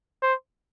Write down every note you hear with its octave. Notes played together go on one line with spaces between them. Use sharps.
C5